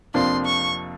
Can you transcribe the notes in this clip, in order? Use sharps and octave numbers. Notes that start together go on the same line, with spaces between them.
F2 C3 F3 A#3 D4 C6
C#6